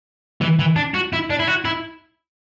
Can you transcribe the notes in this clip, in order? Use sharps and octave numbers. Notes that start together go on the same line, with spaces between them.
E3
E3
D4
F#4
E4
D4
E4
F#4
E4